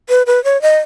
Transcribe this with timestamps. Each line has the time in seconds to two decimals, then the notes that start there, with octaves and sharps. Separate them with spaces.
0.09 B4
0.27 B4
0.44 C#5
0.62 D#5